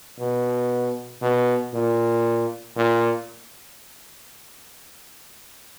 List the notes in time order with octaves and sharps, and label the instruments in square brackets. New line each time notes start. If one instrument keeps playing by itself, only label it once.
[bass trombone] B2
B2
A#2
A#2